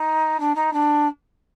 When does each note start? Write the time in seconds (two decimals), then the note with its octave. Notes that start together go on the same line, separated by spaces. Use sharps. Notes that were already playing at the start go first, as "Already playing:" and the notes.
Already playing: D#4
0.40 D4
0.55 D#4
0.73 D4